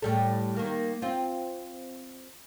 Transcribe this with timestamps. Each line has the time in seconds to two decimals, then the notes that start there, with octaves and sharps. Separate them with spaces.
0.02 A2 G3 A4
0.56 D#3 A#3
1.02 C4 F4